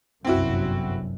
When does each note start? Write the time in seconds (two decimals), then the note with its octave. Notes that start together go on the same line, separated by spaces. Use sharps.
0.25 G1 C2 F#2 C4 E4 F#4